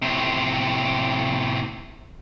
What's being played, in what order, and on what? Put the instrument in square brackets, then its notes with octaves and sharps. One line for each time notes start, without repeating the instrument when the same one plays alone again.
[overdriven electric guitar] A2 C3